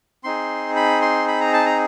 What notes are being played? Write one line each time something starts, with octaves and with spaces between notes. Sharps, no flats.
C4 D#4 G#4 C6
B5
C6
B5
A#5
A5
A#5